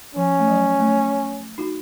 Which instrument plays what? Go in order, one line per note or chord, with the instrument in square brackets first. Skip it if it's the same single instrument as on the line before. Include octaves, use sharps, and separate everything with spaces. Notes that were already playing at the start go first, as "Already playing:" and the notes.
[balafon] F3 [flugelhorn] C#4
[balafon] A3
F#3
A3
D#4 F#4